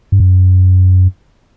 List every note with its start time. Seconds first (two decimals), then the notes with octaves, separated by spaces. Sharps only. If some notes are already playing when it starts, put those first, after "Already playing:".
0.12 G2
0.20 F#2